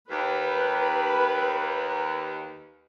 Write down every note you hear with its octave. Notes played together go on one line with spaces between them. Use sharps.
D#2 B4